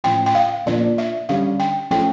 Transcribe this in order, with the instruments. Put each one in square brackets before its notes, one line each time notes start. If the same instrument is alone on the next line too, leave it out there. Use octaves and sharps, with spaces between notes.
[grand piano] A2 F3 C#4 [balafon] G5
[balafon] G5
F5
[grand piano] A#2 F3 A#3 D4 F4 [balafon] D5
[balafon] E5
[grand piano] D3 G3 C#4 [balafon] F5
[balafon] G5
[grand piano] F3 A3 C#4 [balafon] G5